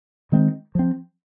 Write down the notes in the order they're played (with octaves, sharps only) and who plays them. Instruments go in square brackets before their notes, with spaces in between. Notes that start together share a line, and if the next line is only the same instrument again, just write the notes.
[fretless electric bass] D#3 G#3 C4
F3 C4